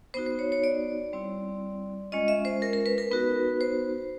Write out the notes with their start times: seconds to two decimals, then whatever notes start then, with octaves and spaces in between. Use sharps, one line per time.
0.14 B3 D#4 F#4 C5
0.26 C5
0.39 C#5
0.52 C#5
0.64 D5
1.13 G3 C4 E4
2.12 G#3 C#4 F4 D#5
2.28 E5
2.45 C5
2.62 A#4
2.73 A#4
2.86 B4
2.98 A#4
3.11 B3 D#4 F#4 B4
3.61 C5